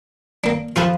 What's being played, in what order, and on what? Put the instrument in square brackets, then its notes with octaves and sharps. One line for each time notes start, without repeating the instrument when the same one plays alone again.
[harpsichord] A#3 D4
[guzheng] F3 B4 C5 [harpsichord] F4 G#4 A4